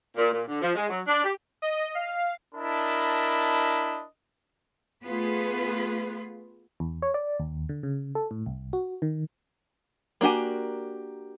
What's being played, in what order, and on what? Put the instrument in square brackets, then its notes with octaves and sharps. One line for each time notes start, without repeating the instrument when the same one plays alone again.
[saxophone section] A#2
A#2
D3
F3
G#3
F#3
D4
G4
[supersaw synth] D#5
F5
[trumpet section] D4 E4 A#4 D#5 A5 B5
[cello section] A3 B3 F4 G#4 B4
[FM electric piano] E2
C#5
D5
D#2
D3
C#3
A4
A2
C2
F#4
D#3
[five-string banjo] A#3 D4 F#4 G4 G#5